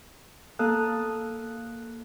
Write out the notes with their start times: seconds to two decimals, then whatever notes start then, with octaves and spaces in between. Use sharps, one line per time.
0.59 A#3 A4 F5 D#6 F#6